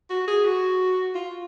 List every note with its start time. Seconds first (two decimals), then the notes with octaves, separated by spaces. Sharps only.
0.10 F#4
0.28 G#4
0.45 F#4
1.15 F4